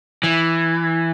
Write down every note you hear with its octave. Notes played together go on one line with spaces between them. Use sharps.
E3